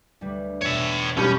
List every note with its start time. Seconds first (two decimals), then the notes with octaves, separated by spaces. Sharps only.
0.21 D2 G3 B4
0.61 E2 B2 C#5 E5
1.17 B1 G3 C#4